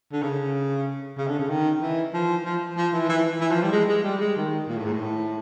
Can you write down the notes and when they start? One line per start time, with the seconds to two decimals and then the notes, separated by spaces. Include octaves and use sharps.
0.12 D3
0.22 C#3
1.17 C#3
1.28 D3
1.39 C#3
1.49 D#3
1.81 E3
2.13 F3
2.45 F3
2.77 F3
2.93 E3
3.09 E3
3.40 E3
3.51 F3
3.62 G3
3.72 G#3
3.89 G#3
4.04 G3
4.20 G#3
4.36 D#3
4.68 A#2
4.77 A2
4.85 G#2
4.93 A2